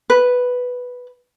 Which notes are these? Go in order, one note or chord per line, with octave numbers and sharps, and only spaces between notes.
B4